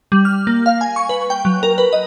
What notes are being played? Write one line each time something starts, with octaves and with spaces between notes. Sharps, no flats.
G3
F6
A#3
F5
G#5
C#6
B4
G5
F#3
A#4
B4
D#5